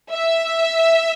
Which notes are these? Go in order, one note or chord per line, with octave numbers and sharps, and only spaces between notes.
E5